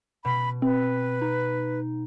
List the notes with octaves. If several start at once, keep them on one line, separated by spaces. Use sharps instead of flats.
B2 B5
C4 B4
D#4